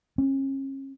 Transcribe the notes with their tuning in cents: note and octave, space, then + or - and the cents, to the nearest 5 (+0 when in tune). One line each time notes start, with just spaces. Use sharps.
C#4 -35